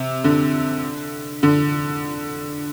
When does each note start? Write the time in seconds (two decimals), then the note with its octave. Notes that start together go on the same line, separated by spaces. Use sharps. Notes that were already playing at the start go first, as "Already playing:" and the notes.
Already playing: C3
0.24 D3
1.43 D3